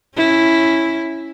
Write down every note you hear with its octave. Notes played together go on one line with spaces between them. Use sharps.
C#4 E4